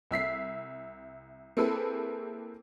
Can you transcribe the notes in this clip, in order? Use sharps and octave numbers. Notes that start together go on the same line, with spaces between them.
C2 E5 B6 C7
A#3 C4 E4 G#4 A4 B4